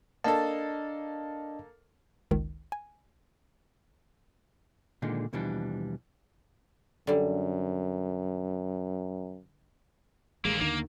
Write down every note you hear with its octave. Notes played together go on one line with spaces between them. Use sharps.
A#3 D4 A4 D#5 A5
G1 C#2 D#3
G#5
A#2 D3 D#3 G#3
D#2 B2 E3 F3 G3 D4
F#2 D3 G3
A1 D#2 G#3 A#3
D#2 D3 D#3 A#3